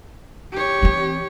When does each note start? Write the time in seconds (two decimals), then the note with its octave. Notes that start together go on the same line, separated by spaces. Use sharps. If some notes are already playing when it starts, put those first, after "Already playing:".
0.52 G4 C#5
0.83 E3 C4